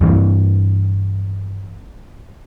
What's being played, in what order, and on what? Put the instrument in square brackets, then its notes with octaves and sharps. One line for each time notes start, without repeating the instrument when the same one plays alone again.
[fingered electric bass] G2 E3